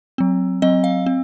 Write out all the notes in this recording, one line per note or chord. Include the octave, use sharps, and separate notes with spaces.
F#3 C4
F#3 C4 D#5
F5
C4